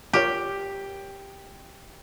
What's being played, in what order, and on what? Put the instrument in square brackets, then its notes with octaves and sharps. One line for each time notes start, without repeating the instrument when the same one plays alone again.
[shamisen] F4 A#4 C#5 [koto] G4